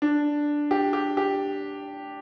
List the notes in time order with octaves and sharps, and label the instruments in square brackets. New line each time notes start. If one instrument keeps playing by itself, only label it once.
[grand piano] D4
G4
G4
G4